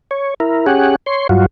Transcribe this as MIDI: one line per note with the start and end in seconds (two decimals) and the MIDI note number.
0.11 0.34 73
0.40 0.66 64
0.40 0.66 70
0.66 0.96 61
0.66 0.96 67
0.66 0.96 68
0.66 0.96 78
1.06 1.27 73
1.06 1.27 84
1.29 1.46 43
1.29 1.46 54
1.29 1.46 65
1.29 1.46 66